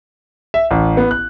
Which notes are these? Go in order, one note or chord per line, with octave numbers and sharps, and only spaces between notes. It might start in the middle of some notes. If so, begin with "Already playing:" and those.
E5
A1
B3
F#6